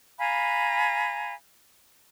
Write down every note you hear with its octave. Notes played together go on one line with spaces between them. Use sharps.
F5 G#5 A#5 B5